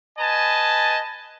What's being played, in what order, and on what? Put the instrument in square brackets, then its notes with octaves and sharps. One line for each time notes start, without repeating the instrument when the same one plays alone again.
[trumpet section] B4 D#5 G#5 A5